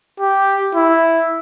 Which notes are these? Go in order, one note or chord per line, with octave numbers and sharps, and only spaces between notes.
G4
E4